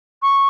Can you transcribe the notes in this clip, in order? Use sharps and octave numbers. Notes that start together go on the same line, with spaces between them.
C#6